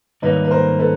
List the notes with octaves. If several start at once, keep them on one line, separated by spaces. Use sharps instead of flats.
G#2 D#3 G3 A#3 B4 C#5
B4
A#4 C5
A4 B4